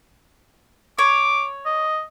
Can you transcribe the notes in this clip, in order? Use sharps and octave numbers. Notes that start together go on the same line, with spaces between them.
C#5 D6
D#5